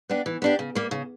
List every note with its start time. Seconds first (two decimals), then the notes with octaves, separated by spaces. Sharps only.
0.09 B3 D4 G4
0.26 E3
0.42 B3 D4 G4
0.59 C#3
0.75 G3 A#3
0.91 C#3